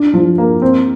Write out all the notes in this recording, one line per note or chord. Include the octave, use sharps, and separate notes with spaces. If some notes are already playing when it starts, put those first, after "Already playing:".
Already playing: D4
F3
A#3
C4